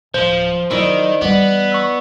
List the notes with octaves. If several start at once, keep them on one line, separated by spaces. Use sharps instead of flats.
D1 F3 C5
D#3 F3 F#3 E4 D5 D#5
E3 G3 B3 D5
C#6 E6